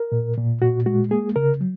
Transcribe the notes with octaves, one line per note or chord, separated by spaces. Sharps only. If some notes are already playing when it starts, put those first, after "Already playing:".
Already playing: A#4
A#2
A#2
A#2 F#4
G#3 F#4
A#3 G#4
C#3 A#4
F#3